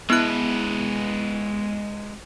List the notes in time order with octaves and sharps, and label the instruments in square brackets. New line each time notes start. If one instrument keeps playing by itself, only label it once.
[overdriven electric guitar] G#3 B4 [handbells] B3 E4 F#6